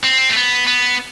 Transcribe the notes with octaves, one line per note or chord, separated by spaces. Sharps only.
C4
A3
B3
B3